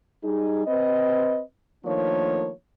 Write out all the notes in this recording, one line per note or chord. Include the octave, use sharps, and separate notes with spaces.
G3 D#4 G#4
C4 B4 D#5
D#3 F3 A3 A#3 D4 C#5